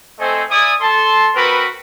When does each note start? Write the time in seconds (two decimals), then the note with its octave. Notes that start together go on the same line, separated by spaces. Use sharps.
0.19 A3 C4 A4 C5 D#5 G#5
0.51 E4 D5 G#5 D#6
0.81 A4 A5 C6
1.35 C4 F#4 A#4 B4